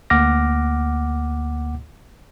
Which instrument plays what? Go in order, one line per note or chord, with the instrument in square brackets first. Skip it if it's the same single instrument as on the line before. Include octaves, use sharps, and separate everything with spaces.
[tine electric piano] D2 A#3 F#5 D6 F6 A#6